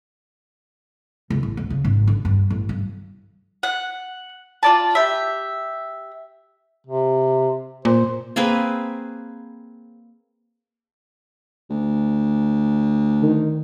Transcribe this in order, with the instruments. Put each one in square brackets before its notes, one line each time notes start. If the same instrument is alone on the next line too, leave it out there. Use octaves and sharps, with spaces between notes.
[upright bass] C#2
A1
D2
C#3
G#1
D3
G2
A1
G2
[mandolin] F#5
F4 D5 A5
G4 E5
[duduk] C3
[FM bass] A#2 [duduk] C5
[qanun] A#3 C4 G#4 B4
[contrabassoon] D2
[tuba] D#3